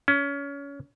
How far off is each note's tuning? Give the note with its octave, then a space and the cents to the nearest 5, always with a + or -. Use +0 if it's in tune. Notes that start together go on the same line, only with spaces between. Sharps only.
C#4 +25